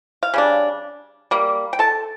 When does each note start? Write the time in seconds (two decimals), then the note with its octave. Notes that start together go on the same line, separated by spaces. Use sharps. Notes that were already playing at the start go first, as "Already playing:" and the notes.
0.23 F5
0.34 C#3 G3 D4
1.31 G3 A#3
1.73 G5
1.79 A4 A5